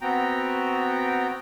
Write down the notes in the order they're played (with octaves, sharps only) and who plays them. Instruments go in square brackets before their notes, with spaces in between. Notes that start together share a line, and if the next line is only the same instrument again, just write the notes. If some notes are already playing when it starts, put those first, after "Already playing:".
[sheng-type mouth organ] B3 C4 F#4 G5 A#5